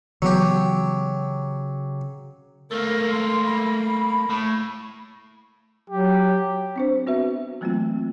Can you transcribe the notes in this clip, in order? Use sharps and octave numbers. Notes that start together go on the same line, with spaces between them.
C#3 E3 F#3 B3 G4
A3 A#3 A#4
C6
B5
A2
F#3 G4
C4 D4 C5
B3 F#4 B4 E5
E3 F#3 A3 A#3 C4 F4